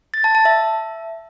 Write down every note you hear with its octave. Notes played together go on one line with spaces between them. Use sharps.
A6
A5
A5
E5